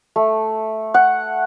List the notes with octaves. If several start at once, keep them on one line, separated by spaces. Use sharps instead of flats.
A3
F#5